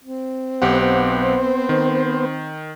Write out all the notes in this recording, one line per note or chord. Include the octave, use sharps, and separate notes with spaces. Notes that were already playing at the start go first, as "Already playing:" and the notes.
C4
B1 B3 G4 C5 F#5
D#3